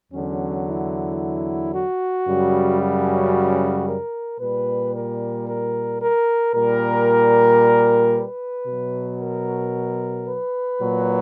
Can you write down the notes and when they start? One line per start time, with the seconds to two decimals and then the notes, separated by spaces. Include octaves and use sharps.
0.13 E2 D3 F#3 C#4
0.66 E4
1.74 F#4
2.27 F#2 C#3 G3
2.79 F#4
3.87 A#4
4.40 A#2 G3 B4
4.93 A#4
5.47 A#4
6.01 A#4
6.53 A#2 G3 A#4
8.14 B4
8.66 B2 F#3
9.20 A#4
10.27 B4
10.80 A#2 F#3